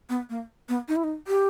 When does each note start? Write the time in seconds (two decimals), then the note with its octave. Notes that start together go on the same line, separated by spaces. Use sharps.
0.09 B3
0.29 A#3
0.69 B3
0.88 D#4
0.96 E4
1.04 D#4
1.27 G4